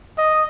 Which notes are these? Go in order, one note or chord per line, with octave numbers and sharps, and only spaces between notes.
D#5